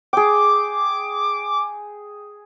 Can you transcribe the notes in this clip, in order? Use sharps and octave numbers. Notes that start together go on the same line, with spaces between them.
G#4 G5 D6